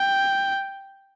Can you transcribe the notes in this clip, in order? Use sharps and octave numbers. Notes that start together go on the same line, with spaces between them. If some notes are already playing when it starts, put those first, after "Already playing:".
Already playing: G5